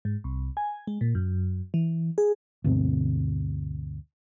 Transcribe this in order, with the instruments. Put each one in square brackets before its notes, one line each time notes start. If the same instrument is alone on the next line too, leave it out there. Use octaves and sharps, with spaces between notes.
[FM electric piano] G#2
C2
G#5
G#3
A#2
F#2
E3
G#4
[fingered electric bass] D2 G2 B2 C4